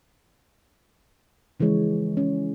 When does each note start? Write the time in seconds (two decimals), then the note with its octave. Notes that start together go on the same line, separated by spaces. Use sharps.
1.60 C#3 E3 F3 G#3 C#5
2.17 C#4